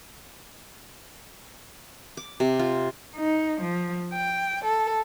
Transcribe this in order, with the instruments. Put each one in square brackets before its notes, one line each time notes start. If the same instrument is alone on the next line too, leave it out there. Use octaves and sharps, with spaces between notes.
[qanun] D6
C3
F4
[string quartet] D#4
F3
G5
A4